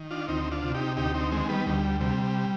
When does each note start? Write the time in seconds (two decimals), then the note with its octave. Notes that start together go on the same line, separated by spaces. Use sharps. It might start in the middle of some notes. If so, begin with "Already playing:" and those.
Already playing: D#3
0.11 D4 F4
0.28 D2 C4 D#4
0.51 D4 F4
0.62 C3
0.74 D#4 G4
0.97 D2 D#4 G4
1.14 C4 D#4
1.31 D#3 G#3 C4
1.49 G3 B3
1.66 D2 G3
2.00 C3 G3